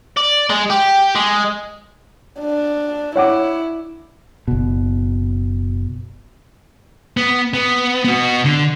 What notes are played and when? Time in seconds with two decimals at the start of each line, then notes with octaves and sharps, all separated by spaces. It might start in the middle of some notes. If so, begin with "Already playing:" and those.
0.17 D5
0.50 G#3
0.70 G4
1.15 G#3
2.40 D4
3.16 E4 C#5 F#5 D6
4.48 F#1 B2
7.17 B3
7.54 B3
8.05 B3 F#4
8.45 D3